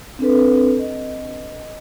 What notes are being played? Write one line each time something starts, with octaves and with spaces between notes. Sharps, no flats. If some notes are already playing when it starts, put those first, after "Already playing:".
C4 D4 A4 B4
D#5